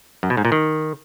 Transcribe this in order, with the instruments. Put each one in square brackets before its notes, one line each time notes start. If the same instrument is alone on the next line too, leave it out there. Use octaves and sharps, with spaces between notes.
[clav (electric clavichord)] F#2
B2
G#2
A#2
D#3